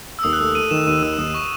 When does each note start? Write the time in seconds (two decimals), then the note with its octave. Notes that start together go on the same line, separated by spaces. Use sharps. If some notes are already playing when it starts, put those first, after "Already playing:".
0.19 E6
0.23 D#2 D#6
0.33 F#6
0.39 A3 E6
0.55 A3 D#7
0.71 D#3 E7
0.87 D#2 D#7
1.02 D#3 E6
1.18 D#2 D#6
1.35 C#6